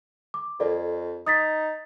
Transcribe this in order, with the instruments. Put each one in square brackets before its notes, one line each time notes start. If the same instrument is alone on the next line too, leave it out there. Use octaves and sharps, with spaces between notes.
[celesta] D6
[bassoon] F2 [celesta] A4 A#4 D5
[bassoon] D#4 [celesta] D#6 A6 B6